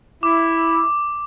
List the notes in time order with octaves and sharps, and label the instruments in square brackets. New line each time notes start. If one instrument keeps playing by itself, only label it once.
[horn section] E4 [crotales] D6